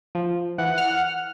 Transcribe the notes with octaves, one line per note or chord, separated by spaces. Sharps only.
F3
E3 F#5
F6